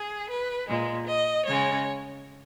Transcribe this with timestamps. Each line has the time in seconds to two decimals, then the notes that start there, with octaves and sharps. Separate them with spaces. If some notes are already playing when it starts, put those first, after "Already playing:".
Already playing: G#4
0.29 B4
0.68 A#2 G#3
1.07 D#5
1.46 C#3 G#3 C#5